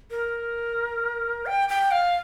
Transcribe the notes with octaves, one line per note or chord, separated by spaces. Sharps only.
A#4
G5
G5
F5